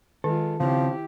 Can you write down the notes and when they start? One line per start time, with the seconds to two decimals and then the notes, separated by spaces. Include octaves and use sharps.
0.24 D#3 G#3 F4 A4
0.60 C#3 F3 C4 C#4 E4 G4